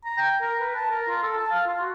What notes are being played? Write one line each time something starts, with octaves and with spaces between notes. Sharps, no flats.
A#5
G5
A#4
B4
A5
A#4
F4
A4
A5
F5
F4
F#4